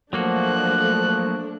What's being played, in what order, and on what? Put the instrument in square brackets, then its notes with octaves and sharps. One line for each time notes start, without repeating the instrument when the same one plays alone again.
[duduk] F3 [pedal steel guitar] F#3 A#3 F#4 [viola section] A3 D4 [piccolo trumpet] F#6